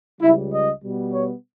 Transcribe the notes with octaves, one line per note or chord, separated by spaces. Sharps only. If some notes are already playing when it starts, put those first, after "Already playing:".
C#2 C#3 G3 E4
D#5
B2 G3 B3
C#5